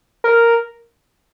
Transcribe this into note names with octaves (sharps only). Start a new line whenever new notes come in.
A#4